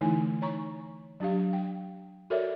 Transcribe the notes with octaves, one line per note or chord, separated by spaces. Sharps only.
D3 E3 A3 D#4 E4 G#5
C#5 A#5 C#6
F#3 D4 G4 F5
G5
F#4 A4 A#4 C#5 D5 E5